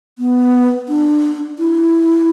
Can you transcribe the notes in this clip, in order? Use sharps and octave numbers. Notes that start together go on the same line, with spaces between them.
B3
D4
E4